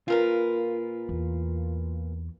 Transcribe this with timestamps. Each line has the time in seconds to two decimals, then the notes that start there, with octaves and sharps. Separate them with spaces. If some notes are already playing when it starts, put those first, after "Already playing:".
0.08 A#2 F4 A#4 B4
1.09 E2